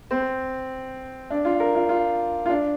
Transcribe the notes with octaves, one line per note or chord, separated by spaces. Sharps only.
C4
D4
F4
A#4
F4
F4
F4
D4